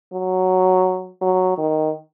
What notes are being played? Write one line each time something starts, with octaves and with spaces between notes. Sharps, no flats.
F#3
F#3
D#3